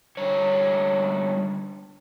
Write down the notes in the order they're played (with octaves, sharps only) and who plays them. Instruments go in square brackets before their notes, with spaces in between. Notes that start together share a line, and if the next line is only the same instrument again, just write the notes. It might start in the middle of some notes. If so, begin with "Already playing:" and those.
[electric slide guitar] D3 G3 C#5